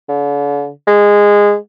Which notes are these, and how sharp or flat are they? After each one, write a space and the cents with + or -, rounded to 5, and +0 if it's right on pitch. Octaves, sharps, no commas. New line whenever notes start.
D3 -45
G#3 -15